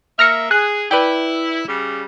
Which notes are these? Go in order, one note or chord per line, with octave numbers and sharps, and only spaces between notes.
A#3 E5 F6 A#6 C#7
G#4 F#6
E4 B4 D5 G5
C#3 G3